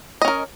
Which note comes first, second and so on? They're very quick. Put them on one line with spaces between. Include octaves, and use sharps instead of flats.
D#5 C#4 A#4